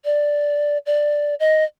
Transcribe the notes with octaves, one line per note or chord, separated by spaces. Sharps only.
D5
D5
D#5